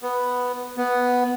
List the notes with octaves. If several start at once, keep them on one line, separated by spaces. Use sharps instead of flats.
B3
B3